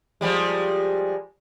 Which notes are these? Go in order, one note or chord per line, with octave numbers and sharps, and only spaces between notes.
F3 G3 G#3